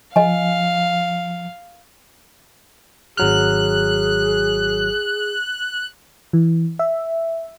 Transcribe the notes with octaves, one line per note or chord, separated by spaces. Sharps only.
F3 D#5 F5 G#5
G#1 F#3 G#4 F6 F#6
E3
E5